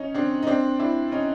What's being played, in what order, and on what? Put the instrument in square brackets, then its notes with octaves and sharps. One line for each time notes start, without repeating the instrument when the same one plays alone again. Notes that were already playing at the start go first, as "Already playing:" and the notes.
Already playing: [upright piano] C#4 D#4
C4 D4
D#4
C4 D4
D4 E4
C#4 D#4